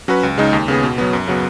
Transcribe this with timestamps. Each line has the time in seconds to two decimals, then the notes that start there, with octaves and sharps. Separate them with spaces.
0.08 F#3 C#4 F#4 B4
0.23 C#2
0.38 C#3 G#3 D#4
0.53 D#2
0.68 C#3 B3 G#4
0.83 B2
0.98 F#3 B3
1.13 F#2
1.28 C#3 F#3 B3